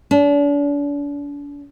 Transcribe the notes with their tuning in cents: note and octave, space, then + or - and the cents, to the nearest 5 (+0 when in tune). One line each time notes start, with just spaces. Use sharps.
D4 -40